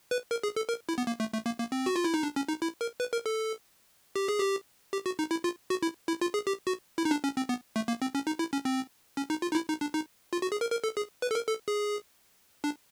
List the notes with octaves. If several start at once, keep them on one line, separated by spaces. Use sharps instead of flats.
B4
A#4
G#4
A4
A#4
E4
B3
A#3
A3
A3
A#3
A#3
C4
F#4
F4
E4
D#4
D4
C#4
D#4
E4
A#4
B4
A#4
A4
G4
G#4
G4
G4
F#4
D#4
E4
F4
F#4
E4
E4
F4
G#4
G4
F#4
E4
D#4
D4
C#4
C4
B3
A3
A#3
C4
C#4
D#4
E4
C#4
C4
C#4
D#4
F4
D#4
E4
D#4
D4
D#4
F4
F#4
G#4
A#4
A#4
A4
G#4
B4
A4
A#4
A4
G#4
D4